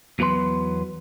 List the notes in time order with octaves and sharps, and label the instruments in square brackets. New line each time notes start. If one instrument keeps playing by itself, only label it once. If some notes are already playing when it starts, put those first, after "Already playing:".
[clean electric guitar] E2 F#3 B3 B4 C6